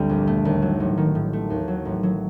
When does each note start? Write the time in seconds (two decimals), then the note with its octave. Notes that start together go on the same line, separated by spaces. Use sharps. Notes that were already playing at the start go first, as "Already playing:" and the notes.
Already playing: G1 D2 G3 C4
0.09 A#1
0.27 A3
0.45 D#2
0.62 F#3
0.80 A1
0.98 D#3
1.15 A2
1.33 A3
1.50 D#2
1.68 F#3
1.85 A1
2.03 F#3